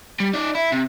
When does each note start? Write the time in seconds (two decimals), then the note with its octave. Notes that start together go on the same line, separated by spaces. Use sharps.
0.20 G3
0.34 D#4 D5
0.55 E4
0.72 C3